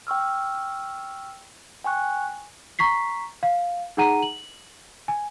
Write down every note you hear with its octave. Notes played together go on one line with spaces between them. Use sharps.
G5 C#6 E6 F6
G5 G#5 C#6 F#6
A#5 C#6 B6 C7
F5
D#4 G#4 F#5 A#5 D#7
F#7
G#5